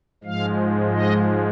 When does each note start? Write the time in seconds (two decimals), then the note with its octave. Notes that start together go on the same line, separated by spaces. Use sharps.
0.24 G#2 F3 G#3 F5
0.93 D#5